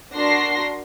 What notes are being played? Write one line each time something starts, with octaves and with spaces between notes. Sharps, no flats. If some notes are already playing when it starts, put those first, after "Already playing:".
D4 F#4 A#4 C6 A#6 C7